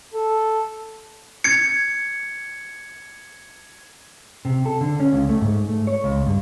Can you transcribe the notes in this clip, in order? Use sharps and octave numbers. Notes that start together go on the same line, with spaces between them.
A4
G#6 C#7
C3
A4
D3
C#4
C#2
A3
G#2
A3
C#5
C#2
G2